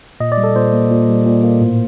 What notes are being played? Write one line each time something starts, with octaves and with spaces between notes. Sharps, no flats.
A#2 D#5
D5
G3
A4
A#2 C5
A#3
A#2
G3
A#2
A#3
A2